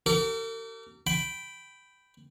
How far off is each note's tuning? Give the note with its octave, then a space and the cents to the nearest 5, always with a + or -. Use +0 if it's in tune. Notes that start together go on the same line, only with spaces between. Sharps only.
G4 -40 A#4 -45
G5 -10 B5 +10